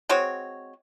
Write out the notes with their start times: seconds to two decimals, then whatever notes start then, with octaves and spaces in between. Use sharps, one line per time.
0.09 G#3 C4 F#4 C#5